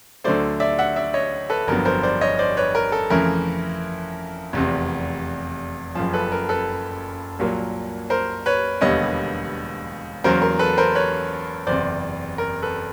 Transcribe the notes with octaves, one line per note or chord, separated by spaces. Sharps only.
D2 D3 F#3 A3 C5 D5
D5 E5
E5 F#5
D5 E5
C#5 D#5
A4 B4
G1 F2 D3 F#3 B3 A#4
A#4 C5
C5 D5
C#5 D#5
C5 D5
B4 C#5
A#4
A4
F2 C#3 E3 A3 A#4
F1 E2 C3
F#1 F#2 C#3 F3
A4 B4
A#4
A4 B4
C2 A#2 F#3 A#3
A#4 C5
B4 C#5
E1 D#2 D3 G3 B3 C#5 D#5
E2 C#3 F#3 A#3 A#4 C5
A#4
A4 B4
A#4 C5
B4 C#5
F#1 E2 C3 C5 D5
A#4
A4 B4